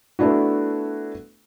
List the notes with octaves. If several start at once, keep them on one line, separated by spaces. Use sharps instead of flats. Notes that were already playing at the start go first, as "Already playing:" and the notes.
A3 B3 D4 E4 F#4